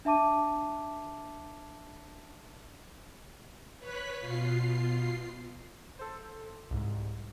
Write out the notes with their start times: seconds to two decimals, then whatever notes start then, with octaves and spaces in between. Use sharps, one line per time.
0.05 D4 E5 A5 D6 D#7
3.80 B4 C#5 F#6 B6
4.20 B2 F4 C7
5.99 A4 C5
6.70 C2 G#2